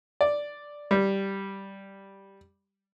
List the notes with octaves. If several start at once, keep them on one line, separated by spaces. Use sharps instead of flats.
D5
G3